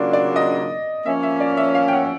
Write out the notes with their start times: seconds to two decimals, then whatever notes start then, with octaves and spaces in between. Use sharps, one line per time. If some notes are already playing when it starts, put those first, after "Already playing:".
Already playing: C#3 F#3 A#3 D4 F4 D5
0.13 D5
0.36 D#5
1.06 F3 A#3 C#4 E5
1.23 E5
1.40 D5
1.57 E5
1.75 F5
1.88 G5
1.93 F#5